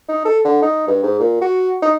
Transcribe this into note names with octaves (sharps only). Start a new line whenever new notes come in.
D#4
A4
D3
D#4
G2
G#2
A#2
F#4
D#4